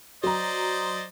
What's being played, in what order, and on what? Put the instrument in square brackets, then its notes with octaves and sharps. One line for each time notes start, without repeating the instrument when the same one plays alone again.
[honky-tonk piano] F#3 A#5 [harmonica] C5 D5 D#5